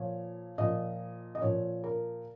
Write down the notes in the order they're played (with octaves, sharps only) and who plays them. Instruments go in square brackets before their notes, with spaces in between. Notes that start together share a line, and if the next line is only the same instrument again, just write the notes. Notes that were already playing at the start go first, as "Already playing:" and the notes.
Already playing: [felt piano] A#2 F3 C#5
A#2 F3 D#5
D#5
A#2 F3 C#5
A#4